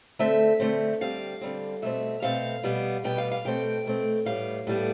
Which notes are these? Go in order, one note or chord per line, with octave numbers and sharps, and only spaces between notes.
D3 A3 C4 E5
D3 A3 C4
D3 G3 C4 F5
D3 G3 C4
B2 A3 C4 E5
B2 A3 C4 F5
B2 G3 B3
B2 G3 B3 G5
F5
F5
B2 A3 C4 G5
B2 A3 C4
A2 G3 B3 F5
A2 G3 B3